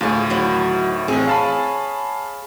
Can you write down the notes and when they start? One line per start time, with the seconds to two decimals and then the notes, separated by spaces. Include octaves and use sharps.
0.01 D2 A2 F4 G#4
0.30 D#3 F#3 E4
1.08 A1 C4 G#4 C#5
1.27 F5 A5 B5